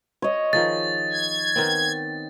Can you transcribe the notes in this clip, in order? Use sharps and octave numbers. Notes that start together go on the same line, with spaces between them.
C#5 D#5
D#3 F3 G#4 A6
G#6
D#3 B3 C4